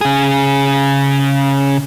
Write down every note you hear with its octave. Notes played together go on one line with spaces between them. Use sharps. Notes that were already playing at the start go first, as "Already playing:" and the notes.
C#3 G#4